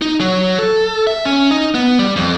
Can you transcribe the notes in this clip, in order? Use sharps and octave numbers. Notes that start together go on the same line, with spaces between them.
D#4
F#3
A4
E5
C#4
D#4
B3
G3
F2